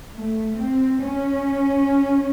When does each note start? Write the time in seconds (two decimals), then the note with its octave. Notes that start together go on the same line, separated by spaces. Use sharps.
0.15 A3
0.58 C4
1.01 C#4